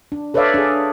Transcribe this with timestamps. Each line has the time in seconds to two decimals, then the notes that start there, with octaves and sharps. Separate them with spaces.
0.12 D4
0.34 A4 B4 C#5 D5 E5 F5
0.54 D4 G#4